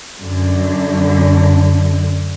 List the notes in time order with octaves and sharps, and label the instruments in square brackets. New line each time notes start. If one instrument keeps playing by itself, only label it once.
[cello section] F#2 D3